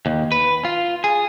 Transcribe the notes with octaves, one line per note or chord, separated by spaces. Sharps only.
D#2
B4
F4
G#4